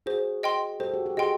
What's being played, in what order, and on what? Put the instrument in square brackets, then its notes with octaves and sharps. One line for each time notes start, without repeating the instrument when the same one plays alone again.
[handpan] F#4 G#4 [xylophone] C5
[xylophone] D#5 G5 C6
[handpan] G4 A4 [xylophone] C5
[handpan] F#4
G4
[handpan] F#4 G#4 [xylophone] D#5 G5 C6